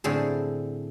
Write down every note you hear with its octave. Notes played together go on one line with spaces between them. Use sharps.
A2 D3 C4 G#4